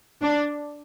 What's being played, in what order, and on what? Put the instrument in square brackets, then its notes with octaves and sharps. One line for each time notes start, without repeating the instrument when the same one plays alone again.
[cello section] D4